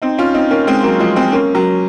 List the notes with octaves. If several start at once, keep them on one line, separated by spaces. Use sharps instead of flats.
C4 D#4
C#4 F4
C4 D#4
A#3 C#4
G#3 C4
F#3 A#3
F3 G#3
G#3 C4
A#3 C#4
F#3 A#3